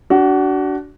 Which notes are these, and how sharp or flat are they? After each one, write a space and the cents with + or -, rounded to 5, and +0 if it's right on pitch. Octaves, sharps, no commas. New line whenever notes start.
D4 -15 F#4 +25